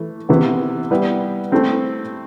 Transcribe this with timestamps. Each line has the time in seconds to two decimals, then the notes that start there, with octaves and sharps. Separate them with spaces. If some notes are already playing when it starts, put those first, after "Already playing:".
Already playing: E3 A3
0.29 C3 E3 B3
0.91 G3 B3 E4 B4
1.52 A3 C4 E4